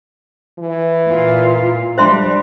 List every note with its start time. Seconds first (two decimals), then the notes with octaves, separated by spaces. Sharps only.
0.59 E3
1.08 A#2 F4
1.98 G3 D4 C5 E5 C6